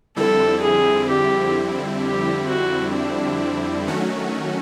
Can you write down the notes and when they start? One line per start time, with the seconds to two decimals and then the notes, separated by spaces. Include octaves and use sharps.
0.16 F2 D3 G3 C4 E4 A4
0.62 G#4
1.09 G4
2.02 G4
2.49 F#4
2.94 D4
3.87 D#3 F#3 A3 C#4 F#4